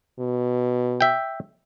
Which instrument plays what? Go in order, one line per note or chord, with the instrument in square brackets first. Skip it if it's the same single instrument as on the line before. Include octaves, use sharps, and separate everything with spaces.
[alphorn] B2
[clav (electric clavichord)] E5 G5